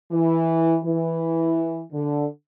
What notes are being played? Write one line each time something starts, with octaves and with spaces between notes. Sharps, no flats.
E3
E3
D3